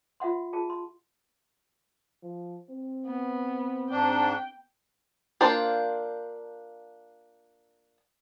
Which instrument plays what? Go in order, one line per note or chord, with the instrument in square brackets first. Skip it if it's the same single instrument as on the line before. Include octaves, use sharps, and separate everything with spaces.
[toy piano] F4 E5 F#5 C6
F4 G#4 A5
C6
[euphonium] F3
C4
[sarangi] B3
[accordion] G#2 D4 [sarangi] G5
[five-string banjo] A#3 D4 F4 C5